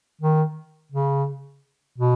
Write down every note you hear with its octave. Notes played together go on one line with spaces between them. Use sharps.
D#3
C#3
B2